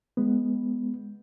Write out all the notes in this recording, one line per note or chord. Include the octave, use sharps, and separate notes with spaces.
G#3 B3